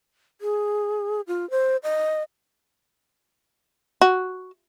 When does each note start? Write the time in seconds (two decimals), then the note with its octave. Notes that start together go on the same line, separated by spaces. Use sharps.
0.41 G#4
1.28 F4
1.51 C5
1.83 D#5
4.01 F#4